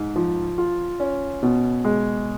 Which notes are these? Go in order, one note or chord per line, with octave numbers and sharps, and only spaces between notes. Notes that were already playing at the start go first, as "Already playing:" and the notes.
Already playing: G#2
F3
F4
C#4
B2
G#3